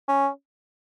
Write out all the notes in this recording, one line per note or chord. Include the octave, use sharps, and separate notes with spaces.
C#4